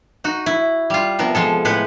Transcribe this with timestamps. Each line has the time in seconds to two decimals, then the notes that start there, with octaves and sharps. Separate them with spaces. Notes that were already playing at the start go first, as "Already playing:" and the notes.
0.24 D#4 F#4
0.46 E4
0.90 G3 F4
1.19 C3 F3 B3 A#4
1.35 F3 G#3 A4
1.65 A2 G#3 B4 F#5